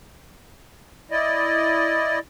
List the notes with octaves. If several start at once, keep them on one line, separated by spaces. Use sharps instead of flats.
E4 D5 D#5